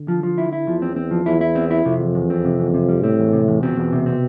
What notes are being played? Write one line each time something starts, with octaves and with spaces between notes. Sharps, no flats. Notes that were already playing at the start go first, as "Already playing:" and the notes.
Already playing: D3
F3
F3
E4
E4
E2 F3
C4
C4
F3
E2 E4
E4
C4
E4
F2 C3
E2
E2
C4
C3
E2
C3
G3
A2 C4
E2
C3
E2
B2 C4
E2
C3
C4